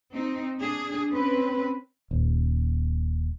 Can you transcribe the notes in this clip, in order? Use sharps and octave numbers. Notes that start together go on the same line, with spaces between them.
C4 D#4
D4 G#4
C4 C#4 B4
D#1